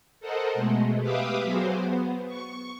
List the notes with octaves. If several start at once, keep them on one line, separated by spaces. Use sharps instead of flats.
A4 A#4 C5 D#5 F#5
B2 G#3 A3
G4 B4 E5 F5 D6 D#6
F#3 B3 F#4 G#4 C5
B3
C#6